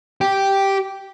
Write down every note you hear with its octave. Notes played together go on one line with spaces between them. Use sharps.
G4